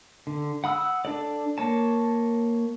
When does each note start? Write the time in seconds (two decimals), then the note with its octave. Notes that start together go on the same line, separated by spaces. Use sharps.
0.27 D3
0.64 F#5 B5 D#6 E6 F#6
1.05 D4 A4 D5
1.58 A#3 C#5 A5